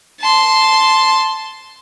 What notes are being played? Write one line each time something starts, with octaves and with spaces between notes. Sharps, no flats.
A5 C6